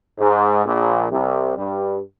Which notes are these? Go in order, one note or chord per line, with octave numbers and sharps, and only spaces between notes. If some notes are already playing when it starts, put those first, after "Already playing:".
G#2
A#1 A#2
C2 C3
G2 G3